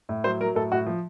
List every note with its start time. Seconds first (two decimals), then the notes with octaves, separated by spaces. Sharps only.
0.09 A2
0.24 F#3 C5
0.40 F#3 A#4
0.55 A2 A4
0.72 A2 F#4
0.86 F3